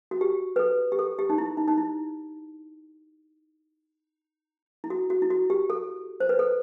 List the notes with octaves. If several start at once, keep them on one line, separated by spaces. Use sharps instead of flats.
F#4
G4
B4
A4
G4
A4
G4
D#4
E4
D#4
D#4
E4
E4
F#4
F#4
E4
F#4
G4
A4
C5
B4
A4